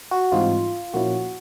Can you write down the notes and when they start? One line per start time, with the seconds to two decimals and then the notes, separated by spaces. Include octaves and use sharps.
0.11 F#4
0.32 G#2 E3 G3 C4 D#4 F4
0.94 A#2 F3 A#3 C#4 E4 F#4